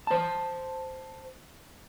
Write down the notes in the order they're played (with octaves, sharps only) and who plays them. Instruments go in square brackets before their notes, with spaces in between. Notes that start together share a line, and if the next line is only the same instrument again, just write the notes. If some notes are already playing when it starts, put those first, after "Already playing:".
[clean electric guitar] C5 A5